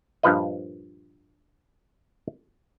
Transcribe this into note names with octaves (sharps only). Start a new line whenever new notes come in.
G2 A#2 F3 B4 D#5